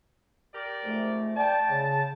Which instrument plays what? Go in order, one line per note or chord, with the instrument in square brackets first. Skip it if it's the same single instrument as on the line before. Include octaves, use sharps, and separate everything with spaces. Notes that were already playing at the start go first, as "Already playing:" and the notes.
[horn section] G4 A#4 D5
[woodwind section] F2 G#2 A3
[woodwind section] D5 G5 [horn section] A5
[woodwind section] C#3